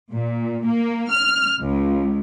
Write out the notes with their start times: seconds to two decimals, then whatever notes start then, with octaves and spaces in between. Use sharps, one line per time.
0.12 A#2
0.64 A#3
1.11 F6
1.60 C#2